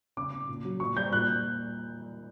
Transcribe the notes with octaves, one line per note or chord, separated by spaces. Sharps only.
C#3 D6
C#3
A#2
F#3
A#2 C#6
G3 G6
A#2 F#6